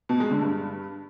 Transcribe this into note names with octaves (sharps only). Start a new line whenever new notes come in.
B2
G#3
D3
G2